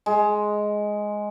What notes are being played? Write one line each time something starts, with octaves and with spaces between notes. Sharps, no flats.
G#3